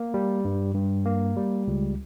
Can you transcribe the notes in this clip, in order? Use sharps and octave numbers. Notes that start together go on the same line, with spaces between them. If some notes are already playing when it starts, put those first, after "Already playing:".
Already playing: A#3
G3
G2
G2
A#3
G3
C#2